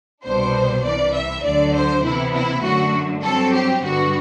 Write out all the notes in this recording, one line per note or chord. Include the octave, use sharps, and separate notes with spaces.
C2 B2 G3 B3 D4 C5
C2 C3 E3 D5
E5
D2 D3 F#3 D5
C5
C3 E3 B3 E4
E4
F#2 D3 A3 F#4
G2 F#3 C4 A4
G4
G2 D3 G3 B3 F#4